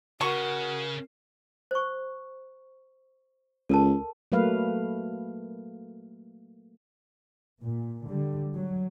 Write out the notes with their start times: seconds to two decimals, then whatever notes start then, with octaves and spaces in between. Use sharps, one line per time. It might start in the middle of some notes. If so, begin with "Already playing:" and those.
0.21 C#3 F#4 A#4 C#6
1.71 C5 C#6
3.69 C#2 A4 A#4 A5
4.32 F#3 A3 A#3 B4 F5
7.62 A#2
8.07 D3 G3
8.55 F#3